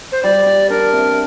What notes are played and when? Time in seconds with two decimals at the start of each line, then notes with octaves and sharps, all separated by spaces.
0.12 C5
0.23 G3 D5
0.46 G4
0.69 D4 A#4
0.93 C3